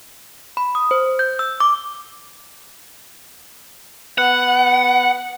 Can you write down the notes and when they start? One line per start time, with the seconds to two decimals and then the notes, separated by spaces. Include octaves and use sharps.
0.57 B5
0.75 D#6
0.91 C5
1.19 G6
1.39 E6
1.60 D6
4.18 B3 F#5